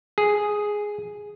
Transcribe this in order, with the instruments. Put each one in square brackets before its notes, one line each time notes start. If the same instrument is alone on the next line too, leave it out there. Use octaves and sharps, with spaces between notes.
[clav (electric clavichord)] G#4